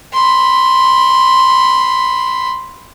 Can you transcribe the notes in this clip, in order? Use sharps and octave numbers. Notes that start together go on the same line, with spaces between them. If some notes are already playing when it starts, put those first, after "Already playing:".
B5 C6